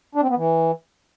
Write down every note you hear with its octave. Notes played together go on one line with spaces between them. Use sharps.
D4
C4
B3
E3